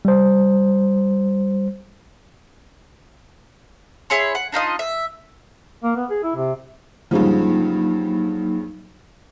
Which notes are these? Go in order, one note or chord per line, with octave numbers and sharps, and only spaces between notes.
G3 C5
E4 G#4 C#5 C6
F#5
D4 D#4 F4 D#5
E5
A#3
B3
G#4
E4
C3
G2 C#3 F3 F#3 A#3 D#4